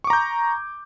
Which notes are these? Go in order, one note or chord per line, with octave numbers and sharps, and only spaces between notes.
A#5 C#6 D6 G6